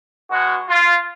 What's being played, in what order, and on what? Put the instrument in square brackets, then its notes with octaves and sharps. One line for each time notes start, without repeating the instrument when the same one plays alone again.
[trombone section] B2 G#3 F#4
F4